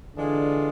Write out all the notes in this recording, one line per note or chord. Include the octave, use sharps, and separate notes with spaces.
D3 E3 G#3 D4 F4 G#4